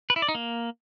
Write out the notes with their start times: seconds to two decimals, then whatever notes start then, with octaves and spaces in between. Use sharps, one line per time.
0.10 B4
0.16 E4
0.22 D5
0.28 D#4
0.35 A#3